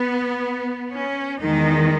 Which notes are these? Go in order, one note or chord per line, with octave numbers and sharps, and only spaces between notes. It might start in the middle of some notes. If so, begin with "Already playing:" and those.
Already playing: B3
C#4
E2 D#3 G#3 D#4